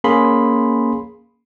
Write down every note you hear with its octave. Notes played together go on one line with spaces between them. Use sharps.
A#3 C#4 G#4 B5 C6